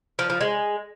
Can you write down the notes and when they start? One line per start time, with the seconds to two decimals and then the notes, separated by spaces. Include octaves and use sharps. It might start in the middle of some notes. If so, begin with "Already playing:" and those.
0.19 F3
0.30 F3
0.41 G#3